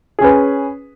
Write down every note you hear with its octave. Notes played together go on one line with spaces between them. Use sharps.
C#4 G#4 B4